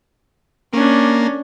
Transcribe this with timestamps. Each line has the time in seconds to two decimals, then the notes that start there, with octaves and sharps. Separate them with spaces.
0.73 A#3 C#4 D4